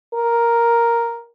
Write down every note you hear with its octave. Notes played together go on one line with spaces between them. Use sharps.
A#4